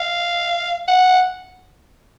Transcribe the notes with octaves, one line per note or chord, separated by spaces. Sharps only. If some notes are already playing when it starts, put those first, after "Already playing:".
Already playing: F5
F#5